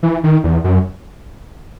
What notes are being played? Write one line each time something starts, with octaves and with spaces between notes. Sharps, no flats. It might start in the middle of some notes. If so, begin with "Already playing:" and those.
E3
D#3
E2
F#2